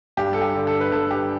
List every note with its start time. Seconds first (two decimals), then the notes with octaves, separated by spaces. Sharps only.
0.17 G2 G4
0.33 A4
0.42 G4
0.54 D3
0.67 A4
0.81 B4
0.92 G2 A4
1.11 G4